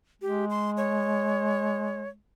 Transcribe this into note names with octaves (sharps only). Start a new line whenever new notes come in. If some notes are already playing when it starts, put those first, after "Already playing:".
G#3 G4
C6
C#5